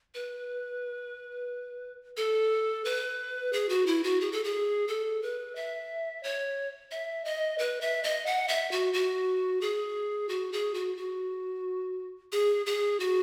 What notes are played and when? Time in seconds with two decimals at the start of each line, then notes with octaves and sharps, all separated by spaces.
0.14 B4
2.17 A4
2.85 B4
3.53 G#4
3.69 F#4
3.86 E4
4.04 F#4
4.21 G#4
4.32 A4
4.44 G#4
4.88 A4
5.22 B4
5.55 E5
6.23 C#5
6.91 E5
7.25 D#5
7.58 B4
7.81 E5
8.04 D#5
8.26 F#5
8.48 E5
8.71 F#4
8.93 F#4
9.61 G#4
10.29 F#4
10.52 G#4
10.74 F#4
10.97 F#4
12.32 G#4
12.66 G#4
13.00 F#4